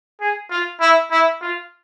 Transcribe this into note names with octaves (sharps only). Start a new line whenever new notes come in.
G#4
F4
E4
E4
F4